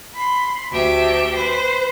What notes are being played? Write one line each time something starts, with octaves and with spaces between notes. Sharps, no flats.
B5 C6
D2 G4 E5
B4 C5